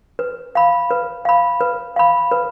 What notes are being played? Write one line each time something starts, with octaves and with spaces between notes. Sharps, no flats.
B4
F5 B5
B4
F5 B5
B4
F5 B5
B4